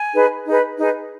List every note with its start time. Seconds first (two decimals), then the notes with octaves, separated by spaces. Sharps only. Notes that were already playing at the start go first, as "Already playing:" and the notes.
Already playing: G#5
0.13 D#4 G#4 B4
0.46 D#4 G#4 B4
0.77 D#4 G#4 B4